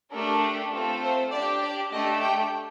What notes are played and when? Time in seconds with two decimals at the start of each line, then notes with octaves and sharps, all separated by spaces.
0.12 A3 D4 G4 A#4
0.72 A3 C4 F4 A4
1.02 C5
1.32 D4 G4 D5
1.62 D5
1.92 A3 D4 G4 D#5
2.21 G5